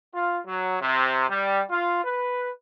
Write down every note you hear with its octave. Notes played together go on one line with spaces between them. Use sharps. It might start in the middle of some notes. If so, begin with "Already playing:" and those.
F4
F#3
C3
G3
F4
B4